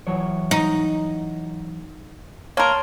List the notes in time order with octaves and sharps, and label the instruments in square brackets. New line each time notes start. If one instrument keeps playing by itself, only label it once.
[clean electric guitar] E3 F#3 C#5
[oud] D#4
[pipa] A#3 A#4 [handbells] C#5 A5 C6